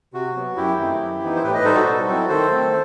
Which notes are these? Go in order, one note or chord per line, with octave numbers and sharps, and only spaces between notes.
C3 F#4
F#3 B3
F#2 E4 G4
D#3 A3 C4 D#4
F#2
E3 B3 D#4
C5
A2 G4 B4
B4 D#5
G3 D#4 A4 C5
F#4 A4
B2
F#3 C4 E4
D#3 A4 C5
A3 C4